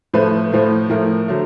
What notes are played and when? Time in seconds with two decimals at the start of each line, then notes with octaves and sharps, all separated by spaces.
0.14 A2 F3 A3 B4
0.52 A2 F3 A3
0.90 A2 F3 A3 A#4
1.28 D3 F#3 A3